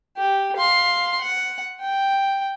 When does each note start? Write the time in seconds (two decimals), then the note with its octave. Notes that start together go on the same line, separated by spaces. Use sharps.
0.17 G4
0.57 F5 C6
1.21 F#5
1.81 G5